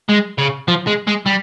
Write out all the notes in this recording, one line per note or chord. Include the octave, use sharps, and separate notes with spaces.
G#3
C#3
F3
G#3
G#3
G3